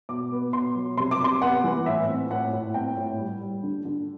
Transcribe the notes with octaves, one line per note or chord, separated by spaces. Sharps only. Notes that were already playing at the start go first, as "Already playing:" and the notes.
B2 D6
B3
B2 C6
F#3
C3 C6
D6
C3 C6
B3 F#5
E3
A2 E5
C4
A2 F#5
A2
C4 G5
A2
G3
G3
D3
D3